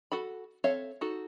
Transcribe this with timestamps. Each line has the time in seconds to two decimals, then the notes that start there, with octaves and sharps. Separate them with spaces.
0.12 F#4 A4 B5
0.64 C4 A4 C#5 E5 F5
1.01 D#4 F#4 A4